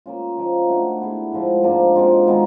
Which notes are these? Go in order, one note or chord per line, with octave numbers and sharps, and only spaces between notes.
A#3 C#4 F4
F3 A#3 D#4
A3 D4 F#4
B3 E4 G#4
A2 F3 G#3
G#2 F3 A#3 D4
B2 G#3 C4 F4
D#3 G#3 B3 D#4